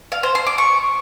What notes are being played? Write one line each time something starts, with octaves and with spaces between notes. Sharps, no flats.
F5
C5
C6
D6
C#6